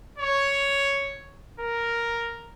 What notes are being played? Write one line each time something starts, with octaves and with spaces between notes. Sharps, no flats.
C#5
A#4